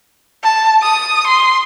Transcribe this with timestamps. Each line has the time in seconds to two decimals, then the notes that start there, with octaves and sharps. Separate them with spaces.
0.43 A5
0.82 D#6
1.27 C6